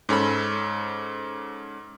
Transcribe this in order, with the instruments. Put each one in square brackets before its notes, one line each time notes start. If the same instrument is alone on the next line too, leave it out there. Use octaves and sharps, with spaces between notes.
[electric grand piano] G#2 C#4 A4 B5